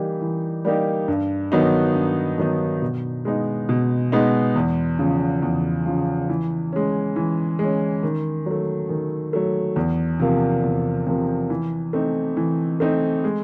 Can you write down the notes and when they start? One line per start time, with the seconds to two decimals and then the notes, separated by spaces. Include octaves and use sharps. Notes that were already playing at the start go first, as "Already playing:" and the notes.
Already playing: E3 G3 A#3 D#4 G4
0.21 E3
0.65 G3 A#3 D#4 G4
1.08 G2
1.52 D#3 F#3 B3 D#4
1.95 G2
2.38 D#3 F#3 B3 D#4
2.82 B2
3.25 G#3 B3 D#4
3.69 B2
4.12 G#3 B3 D#4
4.56 E2
4.99 C#3 F3
5.43 E2
5.86 C#3 F3
6.29 E3
6.73 G#3 C#4
7.16 E3
7.59 G#3 C#4
8.03 D#3
8.46 F#3 A3
8.89 D#3
9.33 F#3 A3
9.76 E2
10.20 C3 F3 A#3
10.63 E2
11.07 C3 F3 A#3
11.50 E3
11.93 A3 C4 D#4
12.37 E3
12.80 A3 C4 D#4
13.24 G#3